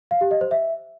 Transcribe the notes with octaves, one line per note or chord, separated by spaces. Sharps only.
F5
G4
D#5
C5
E5